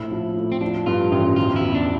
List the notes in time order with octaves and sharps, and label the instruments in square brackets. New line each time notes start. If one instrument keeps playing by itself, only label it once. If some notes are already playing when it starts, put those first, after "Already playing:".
Already playing: [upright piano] A#1 A2 [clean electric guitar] E4
[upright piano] F3
A2
[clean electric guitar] C4
[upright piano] F3 [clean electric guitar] D4
[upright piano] G2 [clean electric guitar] F4
[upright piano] A1 [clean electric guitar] F4
[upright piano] E1 [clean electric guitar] F4
[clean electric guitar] E4
[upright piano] E2
[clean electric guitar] D4